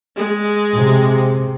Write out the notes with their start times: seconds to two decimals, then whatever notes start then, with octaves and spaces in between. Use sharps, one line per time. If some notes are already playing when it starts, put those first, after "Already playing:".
0.16 G#3
0.75 C3